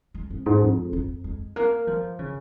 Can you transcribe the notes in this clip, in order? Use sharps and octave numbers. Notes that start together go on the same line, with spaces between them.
G#3
F2
G#2
F2
F2
G#3
A#3
F3
C#3